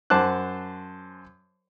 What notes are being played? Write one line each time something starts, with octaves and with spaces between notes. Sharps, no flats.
F#2 C5 A5 D6 F#6